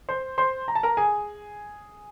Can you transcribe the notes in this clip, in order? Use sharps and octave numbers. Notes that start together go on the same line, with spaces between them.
C5 C6
C5 C6
A#5
A5
A#4 A#5
G#4 G#5